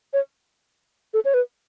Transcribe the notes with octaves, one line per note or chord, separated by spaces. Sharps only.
C#5
A4
C#5
B4